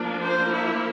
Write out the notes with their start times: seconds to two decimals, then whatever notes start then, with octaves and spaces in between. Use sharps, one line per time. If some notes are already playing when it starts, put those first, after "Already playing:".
Already playing: F3 A#3 D4
0.22 C5
0.51 E4